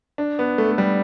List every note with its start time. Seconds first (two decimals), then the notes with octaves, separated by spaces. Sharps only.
0.18 D4
0.39 B3
0.58 A3
0.72 A3
0.78 G3